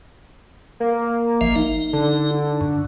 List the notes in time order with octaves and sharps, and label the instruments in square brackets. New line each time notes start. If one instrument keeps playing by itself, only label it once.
[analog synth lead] A#3
[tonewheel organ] G#1 F3 E5
D#4
[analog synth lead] D3
[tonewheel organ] F#2